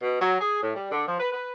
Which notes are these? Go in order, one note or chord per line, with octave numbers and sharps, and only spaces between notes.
B2
F#3
G#4
A2
G3
D3
F3
B4
B4